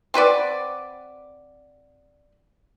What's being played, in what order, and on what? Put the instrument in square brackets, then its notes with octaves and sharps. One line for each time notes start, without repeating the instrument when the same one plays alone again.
[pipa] C4 F#4 B4 D5